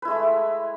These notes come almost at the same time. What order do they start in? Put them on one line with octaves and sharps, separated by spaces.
B4 E4 G#3 A3